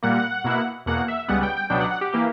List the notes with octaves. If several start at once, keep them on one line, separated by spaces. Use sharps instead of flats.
A#2 G3 A#3 F#5
B2 A#3 E4
E2 B2 A#3 F#5
E5
C#2 C#3 G3 B3 F#5
G5
G5
C#2 B2 F#3 B3 D4 G5
F#5
F#5
G4
E3 A#3 G4